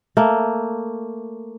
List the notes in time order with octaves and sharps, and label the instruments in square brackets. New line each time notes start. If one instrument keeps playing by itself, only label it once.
[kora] A3 A#3